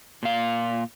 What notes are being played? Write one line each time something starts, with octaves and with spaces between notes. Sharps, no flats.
A#2 F5